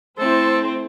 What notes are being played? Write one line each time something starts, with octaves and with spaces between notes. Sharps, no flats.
A3 C4 E4 A4 C5